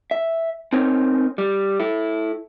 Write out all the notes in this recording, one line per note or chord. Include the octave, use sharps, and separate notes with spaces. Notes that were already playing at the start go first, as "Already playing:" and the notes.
E5
C4 C#4 D#4 A#4 C#5
G3
E4 A4